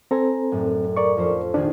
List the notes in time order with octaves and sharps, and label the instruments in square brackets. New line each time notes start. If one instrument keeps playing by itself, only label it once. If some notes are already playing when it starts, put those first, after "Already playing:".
[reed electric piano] C4 A4 C5 [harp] G#5 A#5
[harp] F#2 A2 D4
[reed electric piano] A#4 D5 C#6
[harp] F2 C#4 C5
[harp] A#1 D#3 G#4 [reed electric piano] D4